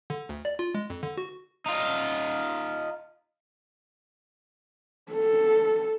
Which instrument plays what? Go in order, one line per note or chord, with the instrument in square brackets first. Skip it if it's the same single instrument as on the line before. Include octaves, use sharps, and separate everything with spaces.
[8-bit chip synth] D3
D2
D5
F4
G#3
F2
D3
F#4
[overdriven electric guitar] D#4 F4
[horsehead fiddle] A4